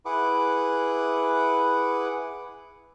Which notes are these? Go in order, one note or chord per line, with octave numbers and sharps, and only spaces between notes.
E4 G#4 B4 F#5 D6